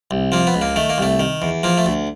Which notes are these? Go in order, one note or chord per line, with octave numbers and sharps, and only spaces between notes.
C2
F3 A#3
B3
C#2
A#3
D#3 A3
A#3
C2 A3
D#3
E2
F3 A#3
A3
D2